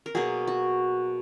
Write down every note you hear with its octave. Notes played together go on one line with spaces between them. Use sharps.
A#4
B2 F#3 A#3 G#4
F#4